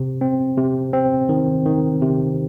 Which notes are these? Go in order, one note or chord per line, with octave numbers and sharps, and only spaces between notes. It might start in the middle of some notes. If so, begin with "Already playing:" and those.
Already playing: C3
C4
C3
C4
D#3
D#3
C3